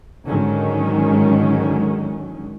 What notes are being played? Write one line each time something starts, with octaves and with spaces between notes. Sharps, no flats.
G#2 D3 D#3 F#3 G#3 C#4